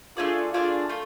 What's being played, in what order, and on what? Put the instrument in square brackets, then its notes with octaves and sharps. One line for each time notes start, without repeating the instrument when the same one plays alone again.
[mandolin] A3 D4 G#4 D5 [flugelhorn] F4
[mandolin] A3 D4 G#4 D5 [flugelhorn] F4
[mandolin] A3 F4